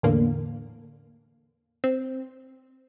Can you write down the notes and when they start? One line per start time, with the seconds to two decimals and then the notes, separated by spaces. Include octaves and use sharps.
0.03 E2 A2 D3 A#3
1.84 C4